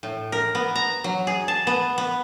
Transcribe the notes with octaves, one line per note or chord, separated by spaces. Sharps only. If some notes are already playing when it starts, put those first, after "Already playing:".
A2
A#4
B3
A#5
F#3
G#4
A5
B3
B3